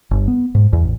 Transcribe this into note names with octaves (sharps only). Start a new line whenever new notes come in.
G1
B3
G#2
E2
A1